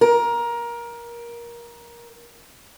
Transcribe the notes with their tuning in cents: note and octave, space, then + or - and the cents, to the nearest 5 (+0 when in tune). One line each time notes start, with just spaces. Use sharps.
A#4 +20